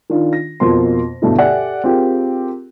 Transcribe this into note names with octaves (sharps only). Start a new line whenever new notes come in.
D#3 D4 F4
A#6
F2 B2 A#3 F4 C6
D2 G2 B2 A3 E4
G4 A4 D5 E5 F#5 G#5
C4 F4 G4 G#4 A#4